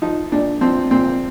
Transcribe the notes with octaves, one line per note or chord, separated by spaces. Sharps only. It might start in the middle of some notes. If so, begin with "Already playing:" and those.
F3 D#4
A#2 D4
F3 C4
A#2 C4